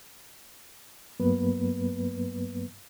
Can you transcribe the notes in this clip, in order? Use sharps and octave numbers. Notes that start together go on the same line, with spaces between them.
G2 F#3 A#3 B3 B4